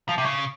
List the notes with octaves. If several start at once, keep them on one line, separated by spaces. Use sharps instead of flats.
F3
C3
C#3